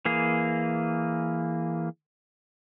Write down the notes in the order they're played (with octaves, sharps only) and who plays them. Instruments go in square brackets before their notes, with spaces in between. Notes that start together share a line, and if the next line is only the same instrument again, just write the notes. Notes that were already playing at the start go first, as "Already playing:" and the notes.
[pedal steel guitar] E3 A#3 G#4